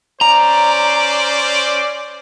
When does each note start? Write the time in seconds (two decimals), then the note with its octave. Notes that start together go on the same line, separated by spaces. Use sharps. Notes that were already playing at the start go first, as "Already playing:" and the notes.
0.21 C#4 C5 D5 A#5